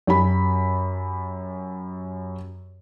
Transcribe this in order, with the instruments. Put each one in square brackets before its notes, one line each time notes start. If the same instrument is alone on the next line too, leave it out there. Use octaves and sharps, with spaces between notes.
[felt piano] F#2 G4 B5